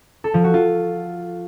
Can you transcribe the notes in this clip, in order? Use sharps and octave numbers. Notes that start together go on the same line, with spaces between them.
A4
F3
F#4
F4